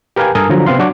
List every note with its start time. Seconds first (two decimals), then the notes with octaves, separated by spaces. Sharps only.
0.16 G4 A#4 B4 F5 G5 G#5
0.35 G2 A4 A#4 G#5 D#6
0.49 D3 F3 F#3 A#5
0.66 C3 B3 C4 F5 C6
0.79 F#3 D4 F#4 D6